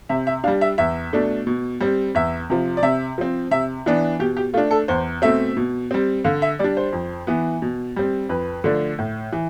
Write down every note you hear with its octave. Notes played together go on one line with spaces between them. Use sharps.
C3 E5
E5
G3 D4 F5
E5
E2 E5
B2 A3 D4
B2
G3 C4
E2 E5
C3 F3
D5
C3 E5
F3 C4
C3 E5
E3 B3 D4
B2 G4
G4
A3 D4 F4
A4
E2 C5
B2 A3 C4 E5
B2
G3 C4
D3 F5
E5
G3 D4 D5
C5
F2
E3 B3
B2
G3 C4
F2 B4
D3 F3 A3 D4
A2
E3